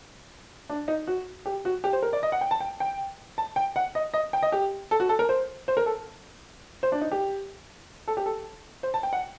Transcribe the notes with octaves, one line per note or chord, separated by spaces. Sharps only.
D4
D#4
F#4
G4
F#4
G4
C5
A#4
D5
D#5
F#5
G5
A5
G5
G5
A5
G5
F#5
D#5
D#5
G5
D#5
G4
A4
F#4
A4
A#4
C5
C5
A#4
A4
C5
D4
D#4
G4
A4
G4
A4
C5
A5
G5
F#5